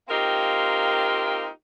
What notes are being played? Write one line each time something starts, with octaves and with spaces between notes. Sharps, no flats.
A#3 C4 D#4 F4 G4 A#4